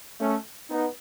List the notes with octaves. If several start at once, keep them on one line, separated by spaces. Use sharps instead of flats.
A3 C#4
B3 D#4